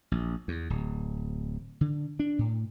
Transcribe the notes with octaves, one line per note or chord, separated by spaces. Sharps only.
A#1
E2
D1
D3
D4
A2